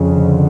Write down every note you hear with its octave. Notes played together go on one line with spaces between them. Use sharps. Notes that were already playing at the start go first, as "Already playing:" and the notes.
Already playing: F2 C#3
D3